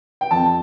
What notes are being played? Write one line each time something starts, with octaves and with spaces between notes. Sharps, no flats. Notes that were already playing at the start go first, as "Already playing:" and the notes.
G5
F2 A5